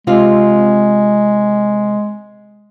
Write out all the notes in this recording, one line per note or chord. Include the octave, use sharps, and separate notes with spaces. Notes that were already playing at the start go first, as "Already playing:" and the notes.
C3 G#3 C4 F4